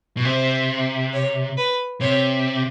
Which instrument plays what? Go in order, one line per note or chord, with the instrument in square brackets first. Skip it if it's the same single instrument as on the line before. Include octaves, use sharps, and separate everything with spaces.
[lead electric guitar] B2
[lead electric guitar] C3 [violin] C5
[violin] C#5
B4
[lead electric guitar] C3 [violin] C#5